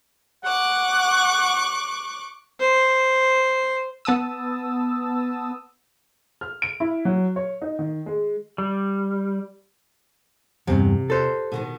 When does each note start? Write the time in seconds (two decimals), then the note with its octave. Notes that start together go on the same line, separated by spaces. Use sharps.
0.45 F#5 C#6 D6 F#6
2.60 C5
4.05 B3 A5 D#6 E6
6.41 F6
6.62 D7
6.80 E4
7.05 F#3
7.36 C#5
7.62 D#4
7.79 D#3
8.06 G#3
8.58 G3
10.67 E2 G2 C3
11.10 A4 C5
11.52 B2 D#3 B3